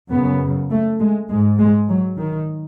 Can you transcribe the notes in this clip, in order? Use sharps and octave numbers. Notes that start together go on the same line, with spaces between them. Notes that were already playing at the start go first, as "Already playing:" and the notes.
F#2 C#3 B3
A3
G#3
G#2 G#3
G#3
F#3
D#3